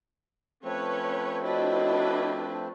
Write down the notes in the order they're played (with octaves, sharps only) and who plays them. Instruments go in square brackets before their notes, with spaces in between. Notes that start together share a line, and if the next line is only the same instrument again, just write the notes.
[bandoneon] F3 A3 C4 [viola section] C#4 B4 C#5
[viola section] D4 E4 B4 [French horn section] F#4 C#5 D#5